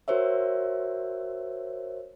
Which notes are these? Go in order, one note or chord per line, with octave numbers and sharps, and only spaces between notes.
F#4 A#4 C5 C#5 E5